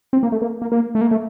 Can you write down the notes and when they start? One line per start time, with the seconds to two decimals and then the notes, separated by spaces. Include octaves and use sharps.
0.13 C4
0.23 A#3
0.32 A3
0.42 A#3
0.62 A#3
0.72 A#3
0.95 A3
1.01 A#3
1.11 A3